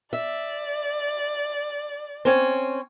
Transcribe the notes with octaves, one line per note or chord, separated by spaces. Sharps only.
D5 E5
C4 C#4 C#5